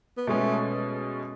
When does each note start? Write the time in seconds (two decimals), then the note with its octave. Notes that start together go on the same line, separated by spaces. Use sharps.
0.17 B3
0.27 B2 G#3 A3 C#4